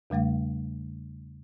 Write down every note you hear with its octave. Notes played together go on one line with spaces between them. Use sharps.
E2 C#3 G3 A3 F5